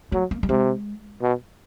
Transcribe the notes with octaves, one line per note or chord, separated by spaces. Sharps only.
F#3 A3
A#3
G3
C3 G#3
B2